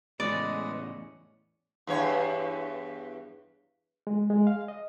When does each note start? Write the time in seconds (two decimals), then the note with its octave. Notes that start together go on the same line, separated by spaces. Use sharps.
0.20 E2 A2 G#3 C#4 B4 D5 D#5
1.87 E2 G2 C#5
4.07 G#3
4.30 G#3
4.47 F5
4.68 D#5